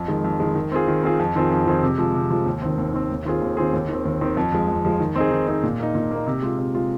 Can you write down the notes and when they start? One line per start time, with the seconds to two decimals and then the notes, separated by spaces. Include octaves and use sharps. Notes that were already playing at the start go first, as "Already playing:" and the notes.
Already playing: F2
0.08 D#3 G#3
0.24 F2
0.40 D#3 G#3
0.55 D#3
0.72 C4 F4 G#4
0.88 D#3
1.03 C4 F4 G#4
1.19 F2
1.35 D#3 C4 F4 G#4
1.50 F2
1.67 D#3 C4 F4 G#4
1.83 C3
1.98 F3 G#3
2.14 C3
2.30 F3 G#3
2.46 D#2
2.62 D#3 C4
2.78 D#2
2.93 D#3 C4
3.10 D#2
3.25 D#3 C4 F4 G#4
3.42 D#2
3.57 D#3 C4 F4 G#4
3.73 D#2
3.89 D#3 C4
4.05 D#2
4.21 D#3 C4
4.37 F2
4.52 F3 G#3
4.68 F2
4.85 F3 G#3
5.00 D#3
5.16 C4 D#4 G#4
5.31 D#3
5.47 C4 D#4 G#4
5.63 A#2
5.80 A#3 D#4
5.95 A#2
6.11 A#3 D#4
6.27 C3
6.42 G#3 F4
6.59 C3
6.74 G#3 F4